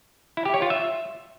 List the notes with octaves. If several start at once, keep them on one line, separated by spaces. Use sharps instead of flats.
E4
G4
C#5
F4
E5